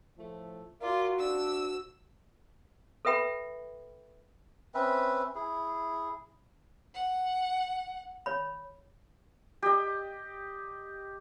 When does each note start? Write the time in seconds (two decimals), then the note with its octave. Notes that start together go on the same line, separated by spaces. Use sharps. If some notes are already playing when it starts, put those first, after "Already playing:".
0.18 A2 F3 A3
0.82 F4 F#4 A#4 D5
1.19 D4 E6
3.05 A4 B4 E5 G5 B5
4.74 C4 C#4 B4 E5
5.35 E4 G#4
6.95 F#5
8.26 C#5 B5
9.62 G4 D#5